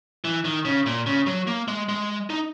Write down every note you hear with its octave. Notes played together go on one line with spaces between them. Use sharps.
E3
D#3
C#3
A#2
C#3
F#3
A#3
G#3
G#3
D#4